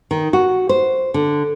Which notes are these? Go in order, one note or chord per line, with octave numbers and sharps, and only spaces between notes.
D#3
F#4
C5
D3